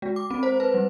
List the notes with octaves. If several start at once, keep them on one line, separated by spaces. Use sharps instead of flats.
G#3
D6
C4
C5
B4
G3